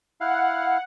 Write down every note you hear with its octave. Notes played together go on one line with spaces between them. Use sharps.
E4 F5 F#5